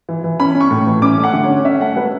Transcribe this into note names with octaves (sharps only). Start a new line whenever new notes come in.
E3
E3
C#4 B5
C#4
C#6
A2
E3
C#4 D6
A3
F#5
D3
C#4 C#5
C#4 E5
A3 F#5
A3 B4